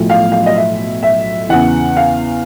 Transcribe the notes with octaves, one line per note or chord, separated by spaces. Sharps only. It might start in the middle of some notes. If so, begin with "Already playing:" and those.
Already playing: B1 A2 F3
F5
F5
D#5
E5
E5
E2 C#3 E3 F#5
F5